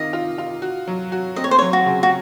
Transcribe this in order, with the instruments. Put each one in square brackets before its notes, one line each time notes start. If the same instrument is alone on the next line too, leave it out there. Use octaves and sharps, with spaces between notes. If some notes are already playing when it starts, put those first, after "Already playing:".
Already playing: [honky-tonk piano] C3 D#3 F4 [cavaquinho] D#5
[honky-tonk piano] F4
F4
F#4
F#3
F#4
[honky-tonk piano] C4 [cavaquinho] D#5
[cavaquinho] C#5
C5
[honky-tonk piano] F#3 [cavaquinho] C#5
[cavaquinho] F#4
[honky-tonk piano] C#3
[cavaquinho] F#4